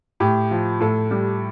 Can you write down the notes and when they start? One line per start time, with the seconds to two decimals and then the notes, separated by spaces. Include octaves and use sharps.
0.20 A2 G4
0.51 F3
0.80 A2 A4
1.11 G3